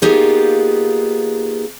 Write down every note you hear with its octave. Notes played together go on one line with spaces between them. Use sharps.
A#3 B3 D#4 F4 G4 G#4